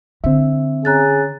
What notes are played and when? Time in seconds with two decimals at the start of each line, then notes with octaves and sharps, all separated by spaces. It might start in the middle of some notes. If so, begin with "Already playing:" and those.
0.24 D3 C4 E5
0.85 C#4 G#4 A#5 F#6 A6